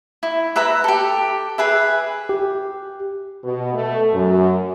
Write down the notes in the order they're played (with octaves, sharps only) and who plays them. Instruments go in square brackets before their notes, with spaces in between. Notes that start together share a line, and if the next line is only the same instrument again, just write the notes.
[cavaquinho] E4
B4 E5 A#5 B5
G4 A4
G#4 B4 E5
[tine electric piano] G4
[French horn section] B2
A3
F#2